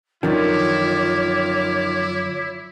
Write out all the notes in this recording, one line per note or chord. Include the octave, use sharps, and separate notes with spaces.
F#2 D3 D#3 F3 E4 F4 C#5 D6